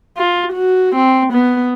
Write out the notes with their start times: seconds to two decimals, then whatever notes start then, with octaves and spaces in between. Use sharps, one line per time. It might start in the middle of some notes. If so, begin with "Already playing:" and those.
0.17 F4
0.52 F#4
0.95 C4
1.33 B3